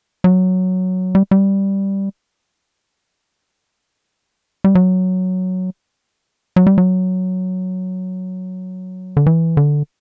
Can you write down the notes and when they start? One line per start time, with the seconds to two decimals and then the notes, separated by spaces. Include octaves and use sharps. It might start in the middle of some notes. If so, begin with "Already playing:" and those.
0.24 F#3
1.15 G3
1.31 G3
4.64 G3
4.75 F#3
6.56 F#3
6.67 G3
6.78 F#3
9.17 D3
9.26 E3
9.57 D3